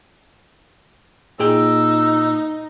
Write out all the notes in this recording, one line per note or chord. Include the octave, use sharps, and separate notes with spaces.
A#2 D#4 G#4 G5 E6